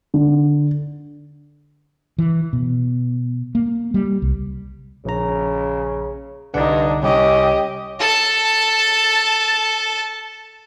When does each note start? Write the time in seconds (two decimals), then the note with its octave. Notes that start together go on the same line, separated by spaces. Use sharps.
0.14 D3
2.18 E3
2.53 B2
3.55 A#3
3.94 G3
4.22 C2
5.05 A#1 C#3 A#5
6.54 C2 G2 D3 D4 D#4 F#5
7.02 C2 C#4 G4 D#5
8.00 A4 A5